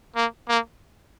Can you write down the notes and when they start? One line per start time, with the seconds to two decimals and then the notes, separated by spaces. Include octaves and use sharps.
0.16 A#3
0.49 A#3